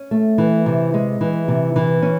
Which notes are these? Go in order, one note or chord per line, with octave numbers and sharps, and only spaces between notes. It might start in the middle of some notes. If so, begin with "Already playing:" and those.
Already playing: C#4
A3
E3
C3
G#3
E3
C3
E3
C#4